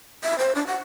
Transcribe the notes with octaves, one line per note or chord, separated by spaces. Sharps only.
E5
C5
D4
F#5